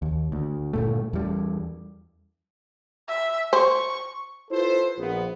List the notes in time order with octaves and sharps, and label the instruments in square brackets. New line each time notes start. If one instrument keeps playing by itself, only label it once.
[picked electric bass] D#2
D2
G1 A#2 A3
E2 G3
[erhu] E5
[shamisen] C5 [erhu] C#6
[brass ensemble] E4 F4 A4 B4 C5
A#1 F3 B3